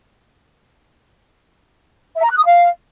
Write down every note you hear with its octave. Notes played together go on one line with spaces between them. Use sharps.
E5
A#5
F#6
D#6
F5